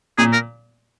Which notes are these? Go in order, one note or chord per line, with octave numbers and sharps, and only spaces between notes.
A#2 G#4
A#4